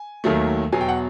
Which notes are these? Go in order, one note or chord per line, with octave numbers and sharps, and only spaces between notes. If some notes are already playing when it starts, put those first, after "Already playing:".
Already playing: G#5
D#2 D#3 F#3 A3
E2 B2 F#3 G#5
G5
F#5